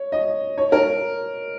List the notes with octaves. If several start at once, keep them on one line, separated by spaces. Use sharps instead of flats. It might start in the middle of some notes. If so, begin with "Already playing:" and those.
Already playing: C#5
D#5
C#5
A#4